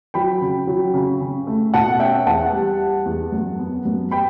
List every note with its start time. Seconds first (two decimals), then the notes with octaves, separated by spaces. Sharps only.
0.14 F#3 G5 B5
0.41 C#3
0.67 F#3
0.94 C#3
1.20 C#3
1.47 A3
1.74 B2 F#5 A5
2.00 C#4 E5 G5
2.26 E2 F#5 A5
2.53 G3
2.79 G3
3.06 E2
3.32 F#2
3.59 B3
3.85 F#2
4.11 G5 B5